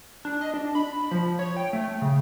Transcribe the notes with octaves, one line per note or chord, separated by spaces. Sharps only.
D4
D#5
D4
B5
F3
C#5
G5
A3
C#3